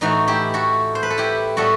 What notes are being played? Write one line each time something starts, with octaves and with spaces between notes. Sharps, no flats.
A2 E3 A3 D#4 F#4
E4 G4
F#4 A4
C5
B4
A4
E4 G4
A2 G3 B3 F#4 A4